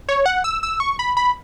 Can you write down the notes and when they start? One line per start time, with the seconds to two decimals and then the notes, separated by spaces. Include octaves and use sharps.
0.09 C#5
0.26 F#5
0.44 E6
0.63 E6
0.80 C#6
0.99 B5
1.17 B5